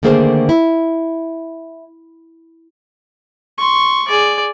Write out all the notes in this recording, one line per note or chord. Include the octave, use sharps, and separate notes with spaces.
D3 D#3 A3 A#3 G#4 C5
E4
C6 C#6
G#4 D5